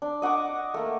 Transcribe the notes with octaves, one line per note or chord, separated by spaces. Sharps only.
D4
D#5 F#5 C#6 D6
A3 A#3